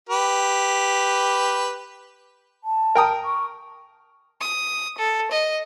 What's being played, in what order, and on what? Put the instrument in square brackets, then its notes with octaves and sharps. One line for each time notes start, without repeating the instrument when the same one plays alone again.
[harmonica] G4 B4
[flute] A5
[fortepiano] A#4 G5 D#6
[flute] C#6
[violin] D#6
A4
D#5